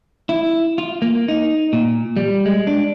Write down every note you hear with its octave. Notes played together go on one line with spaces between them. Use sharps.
E4
F4
A#3
D#4
A#2
G3
G#3
D4